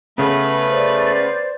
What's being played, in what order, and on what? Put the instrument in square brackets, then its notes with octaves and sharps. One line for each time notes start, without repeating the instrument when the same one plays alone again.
[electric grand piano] C#3 B3 [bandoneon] A3 [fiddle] B4
[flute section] C5 D5